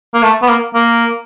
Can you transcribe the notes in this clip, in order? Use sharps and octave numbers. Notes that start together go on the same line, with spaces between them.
A#3
A3
B3
A#3
A#3